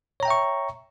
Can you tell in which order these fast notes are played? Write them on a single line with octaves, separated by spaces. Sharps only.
C#5 A#5 G5 E5 C#6